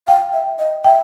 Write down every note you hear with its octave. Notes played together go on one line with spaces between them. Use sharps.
F5 G5
E5
D#5
E5 G5